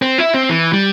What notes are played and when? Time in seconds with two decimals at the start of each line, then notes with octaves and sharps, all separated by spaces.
0.02 C4
0.18 E4
0.34 C4
0.49 E3
0.73 G3